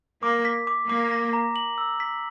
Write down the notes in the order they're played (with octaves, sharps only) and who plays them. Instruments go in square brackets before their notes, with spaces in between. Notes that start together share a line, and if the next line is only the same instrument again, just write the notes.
[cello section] A#3 [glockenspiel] D6
[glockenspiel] B6
D6
[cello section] A#3 [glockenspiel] D6
[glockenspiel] A#6
A#5
F#7
E6
B6